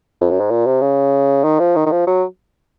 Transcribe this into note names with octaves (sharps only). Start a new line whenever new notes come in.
F2
F#2
G#2
A#2
C3
C#3
D#3
F3
D#3
D#3
F3
F#3